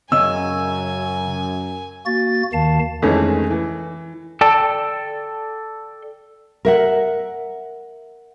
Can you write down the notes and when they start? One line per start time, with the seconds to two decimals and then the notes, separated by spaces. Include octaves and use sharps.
0.12 F#2 C#3 C#4 D#5 G#5 E6
2.06 A#3 F#4 A6
2.53 D#2 D#3 F5 A5
3.02 F2 D#3 E3 G#3 A3 C#4
3.51 E3
4.41 A4 D5 G5 A5
6.65 A#4 E5 F#5